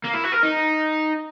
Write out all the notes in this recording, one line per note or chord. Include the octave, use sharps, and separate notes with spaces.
A#3
E4
F#4
A#4
D#4